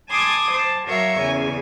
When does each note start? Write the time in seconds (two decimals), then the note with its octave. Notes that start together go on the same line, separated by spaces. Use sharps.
0.10 G#5 A5 C6 D6 D#6 G#6
0.53 C5 A5
0.88 F#3 F#4 A#4 C#5 E5 F5
1.19 E2 C#3 G#5